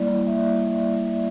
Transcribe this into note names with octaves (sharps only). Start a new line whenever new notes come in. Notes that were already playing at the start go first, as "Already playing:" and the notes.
Already playing: G3 A#3 E4 D5
E5